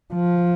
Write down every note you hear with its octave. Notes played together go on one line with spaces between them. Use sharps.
F3